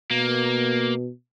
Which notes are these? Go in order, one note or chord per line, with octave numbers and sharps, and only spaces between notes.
B2 A#3